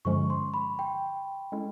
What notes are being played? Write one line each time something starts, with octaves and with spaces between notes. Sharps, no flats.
G2 D3 F3 G#3 C#4 C#6
C6
B5
G5
G#3 C#4 E4 A4